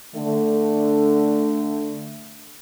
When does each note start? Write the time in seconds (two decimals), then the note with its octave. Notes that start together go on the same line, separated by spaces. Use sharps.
0.15 D3 A3